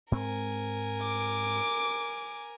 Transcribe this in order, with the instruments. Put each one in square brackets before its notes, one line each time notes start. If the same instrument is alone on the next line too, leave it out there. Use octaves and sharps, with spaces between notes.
[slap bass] G#2 C4 [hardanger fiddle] A#4 G#5
[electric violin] D6 D7